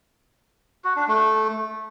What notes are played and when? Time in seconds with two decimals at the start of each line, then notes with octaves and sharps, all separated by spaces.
0.84 F#4
0.96 D4
1.08 A3